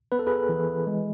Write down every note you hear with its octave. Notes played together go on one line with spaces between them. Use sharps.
B3 B4
A4
G#4 B4
E3
G#3